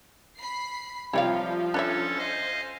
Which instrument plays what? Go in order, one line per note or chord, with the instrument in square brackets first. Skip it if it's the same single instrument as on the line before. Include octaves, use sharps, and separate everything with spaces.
[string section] B5 C7
[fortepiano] C3 G3 D5 [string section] F3 [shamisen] E4 C#5 F5
[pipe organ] C#4 A4 A6 [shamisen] D4 C#5 E5
[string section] C5 [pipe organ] D#5 F5 G#5